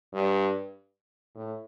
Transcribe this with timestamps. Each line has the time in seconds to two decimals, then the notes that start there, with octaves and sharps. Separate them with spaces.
0.13 G2
1.35 A2